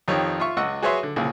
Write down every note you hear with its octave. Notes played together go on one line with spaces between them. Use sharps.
F2 D#3 G4 C#5
F4 E5 C#6
C#2 D#5 F#5 C#6 E6
F#4 G#4 B4 C#5 E5 C6
D3
C2 A#2 C#3